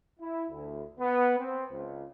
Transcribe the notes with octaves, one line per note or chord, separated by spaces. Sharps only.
E4
D2
B3
C4
C#2